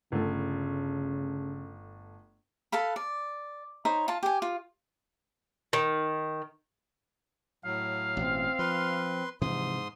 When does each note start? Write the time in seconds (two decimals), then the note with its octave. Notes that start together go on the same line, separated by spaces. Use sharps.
0.12 G1 C#3 A3
2.72 A4 B4 F5 B5
2.96 D5
3.85 D#4 C5 C#5 B5
4.08 F4 A5
4.23 G4 G#5
4.42 F4
5.73 D#3
7.65 A2 F#3 F5
8.17 A1 B2 C4
8.59 F3 B4 C6
9.42 G#2 C3 E3 F3 C6 D#6